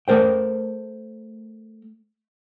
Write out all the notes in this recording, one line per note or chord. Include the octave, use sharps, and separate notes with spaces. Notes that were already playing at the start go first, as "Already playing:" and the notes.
A3 A#4 C5 G5